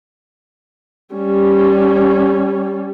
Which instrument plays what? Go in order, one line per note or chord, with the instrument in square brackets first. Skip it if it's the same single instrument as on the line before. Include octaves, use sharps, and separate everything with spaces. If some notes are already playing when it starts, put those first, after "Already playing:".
[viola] G3 C#4